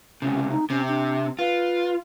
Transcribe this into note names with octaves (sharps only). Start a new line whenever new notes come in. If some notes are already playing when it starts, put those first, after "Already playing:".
C#2 C3 C#4
D#4
C3 C#4
D4
F4 B4